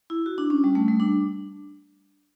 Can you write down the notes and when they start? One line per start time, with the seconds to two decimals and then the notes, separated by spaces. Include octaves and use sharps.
0.10 E4
0.26 F#4
0.38 D4
0.50 C#4
0.64 G3
0.75 A3
0.88 G3
1.00 D4